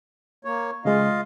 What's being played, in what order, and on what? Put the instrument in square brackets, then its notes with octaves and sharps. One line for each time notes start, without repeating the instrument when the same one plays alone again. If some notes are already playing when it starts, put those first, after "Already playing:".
[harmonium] A#3 C#5
[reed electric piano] C#3 G#3 [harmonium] F4 D#5 F5